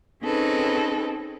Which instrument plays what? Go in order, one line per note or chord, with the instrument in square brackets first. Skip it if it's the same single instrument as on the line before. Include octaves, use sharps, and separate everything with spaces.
[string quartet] C4 C#4 D#4 G#4 A4 B4